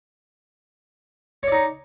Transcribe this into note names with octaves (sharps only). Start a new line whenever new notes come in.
D#4 C#5 D5